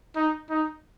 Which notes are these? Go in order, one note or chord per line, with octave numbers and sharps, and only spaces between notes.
D#4
D#4